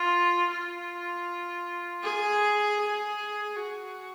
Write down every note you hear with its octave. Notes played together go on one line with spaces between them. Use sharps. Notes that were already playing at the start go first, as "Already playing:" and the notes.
Already playing: F4
F4
G#4
G#4
F#4